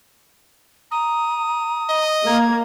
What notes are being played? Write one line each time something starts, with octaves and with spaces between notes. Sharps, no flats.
A#5 D#6
D#5
A#3 A#5 G#6